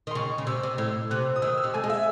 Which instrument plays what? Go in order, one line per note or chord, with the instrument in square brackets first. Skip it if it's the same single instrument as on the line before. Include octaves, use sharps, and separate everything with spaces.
[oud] D#3
[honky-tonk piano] C6
[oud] C#3 [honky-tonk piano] C#6
[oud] C#3
[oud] C3 [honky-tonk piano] E6
[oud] C3
[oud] A2 [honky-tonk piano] E6
[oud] C3 [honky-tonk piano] F#6
[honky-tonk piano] D#6
[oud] D#3 [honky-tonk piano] E6
[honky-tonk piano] E6
[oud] C3
[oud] A3 [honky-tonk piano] G#5
[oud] G#3
[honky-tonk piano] E5